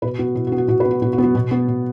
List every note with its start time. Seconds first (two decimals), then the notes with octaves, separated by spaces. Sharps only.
0.02 B2 B4
0.18 B3 F#4
0.35 B2 E4
0.47 F#4
0.52 B3
0.58 F#4
0.68 B2 F#4
0.80 B4
0.85 B3
0.91 F#4
1.02 B2 F#4
1.13 F#4
1.18 B3
1.24 F#4
1.35 B2
1.51 B3
1.68 B2